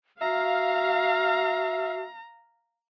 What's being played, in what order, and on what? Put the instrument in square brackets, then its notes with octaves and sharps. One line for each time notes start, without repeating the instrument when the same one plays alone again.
[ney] F#4 [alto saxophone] E5 [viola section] F5 [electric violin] A#5